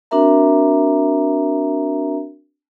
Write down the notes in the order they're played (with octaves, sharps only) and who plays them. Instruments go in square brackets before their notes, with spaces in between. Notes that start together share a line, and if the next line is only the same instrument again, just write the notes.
[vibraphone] C4 D4 F#4 A#4 E5 A#5